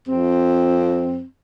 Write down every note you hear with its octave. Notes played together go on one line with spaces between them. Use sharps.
F2 C4